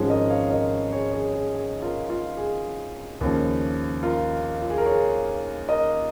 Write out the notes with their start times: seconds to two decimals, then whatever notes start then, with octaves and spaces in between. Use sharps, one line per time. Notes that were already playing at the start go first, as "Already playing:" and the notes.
Already playing: G#1 G#2 F3 G#3 C#4 G#4
0.10 A#4 D#5
0.30 C#5 F5
0.51 A#4 D#5
0.92 G#4 C#5
1.13 G#4 C#5
1.33 G#4
1.54 G#4
1.82 F4 A#4
2.10 F4
2.37 G#4
3.21 D#2 C#3 F3
4.03 F4 A#4
4.62 F4
4.70 G#4
4.78 A#4
4.86 G#4 C#5
5.69 A#4 D#5